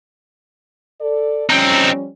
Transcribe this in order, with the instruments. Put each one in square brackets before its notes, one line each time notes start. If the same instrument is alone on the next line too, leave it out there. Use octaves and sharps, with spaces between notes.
[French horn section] A4 D5
[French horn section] F3 G3 C#4 [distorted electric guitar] C4 D#4